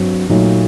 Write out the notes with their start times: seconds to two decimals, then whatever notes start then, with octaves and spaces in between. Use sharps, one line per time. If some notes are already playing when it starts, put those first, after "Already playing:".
Already playing: G2 F#3 C4
0.30 A#2 F#3 A3 D#4